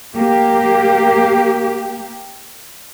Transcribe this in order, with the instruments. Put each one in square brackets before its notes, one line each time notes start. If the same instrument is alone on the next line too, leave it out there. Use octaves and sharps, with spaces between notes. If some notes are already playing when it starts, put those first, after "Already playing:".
[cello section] A#3 G4